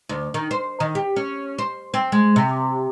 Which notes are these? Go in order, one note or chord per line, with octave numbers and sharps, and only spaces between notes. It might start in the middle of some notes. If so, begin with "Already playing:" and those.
D2
D#3
C5
D#3
G4
C#4
C5
C4
G#3
C3